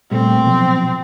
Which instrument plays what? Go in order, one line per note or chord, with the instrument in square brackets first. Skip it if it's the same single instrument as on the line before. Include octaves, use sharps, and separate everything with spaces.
[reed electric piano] A#2 G3 A3 [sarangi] C4
[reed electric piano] B2 F3 F#3